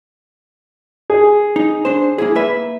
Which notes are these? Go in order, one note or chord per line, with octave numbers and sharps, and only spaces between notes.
G#4
D#4
D4 C5
A#3 E4 G#4
A#3 B4 E5